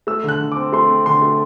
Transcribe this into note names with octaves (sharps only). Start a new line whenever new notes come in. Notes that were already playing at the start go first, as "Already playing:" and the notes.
A3 E6
D3
F#6
D3
D6
C4
A3 C6
C4
D3 C6
A3